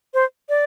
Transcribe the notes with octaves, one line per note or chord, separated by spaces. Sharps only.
C5
D5